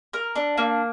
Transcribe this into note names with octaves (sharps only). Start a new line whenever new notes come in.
A#4
D4
A#3